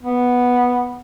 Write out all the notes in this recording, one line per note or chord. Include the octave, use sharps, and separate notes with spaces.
B3